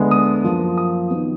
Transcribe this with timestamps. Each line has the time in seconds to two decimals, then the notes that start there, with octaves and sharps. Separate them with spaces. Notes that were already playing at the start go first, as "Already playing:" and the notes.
Already playing: D2 D3 G#3 B3
0.11 D#6
0.44 F#2 F3 A#3
0.78 D#6
1.10 D#3 F#3 B3